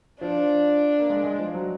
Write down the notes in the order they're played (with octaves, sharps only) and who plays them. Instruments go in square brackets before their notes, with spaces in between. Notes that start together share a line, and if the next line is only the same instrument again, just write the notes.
[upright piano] F3 [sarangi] D4
[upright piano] A#3
G#3
G#3
F3
F#3